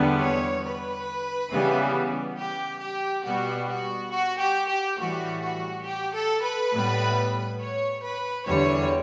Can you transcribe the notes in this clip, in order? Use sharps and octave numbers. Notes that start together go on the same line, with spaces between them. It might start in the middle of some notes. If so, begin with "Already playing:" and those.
Already playing: E2 D3 G3 B3
C#5
B4
C#3 E3 G3 B3
G4
G4
B2 G3 B3 F#4
F#4
F#4
G4
G4
A2 E3 G3 F#4
F#4
G4
A4
B4
A2 G3 B3
C#5
B4
E2 D3 G3 C#5